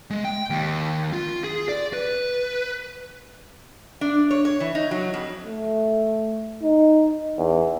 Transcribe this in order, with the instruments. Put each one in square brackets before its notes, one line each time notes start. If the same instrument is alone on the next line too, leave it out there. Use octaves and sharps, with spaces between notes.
[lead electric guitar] G#3
G5
D#2
F4
G#4
D5
B4
[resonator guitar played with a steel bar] D4
C#5
C#5
E3
D#4
F#3
F2
[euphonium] A3
D#4
E2